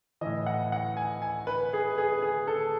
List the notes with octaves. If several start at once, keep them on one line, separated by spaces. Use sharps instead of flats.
A2 E3 D#5
F#5
F#5
G#5
G#5
B4
G#4
G#4
G#4
A4